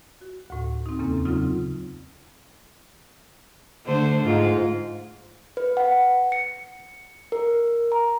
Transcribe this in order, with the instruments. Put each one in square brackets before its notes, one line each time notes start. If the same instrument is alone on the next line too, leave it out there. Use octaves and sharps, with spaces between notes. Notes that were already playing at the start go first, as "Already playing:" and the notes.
[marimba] F#4
D2 A2
C4 D#4
E2 C#3 A#3 C4 C#4 A4
C#3 F#3 C4 D#4 F4
[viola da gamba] D3 A3 C5
G#2 F4
[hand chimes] B4
F#5
C#7
A#4
A#5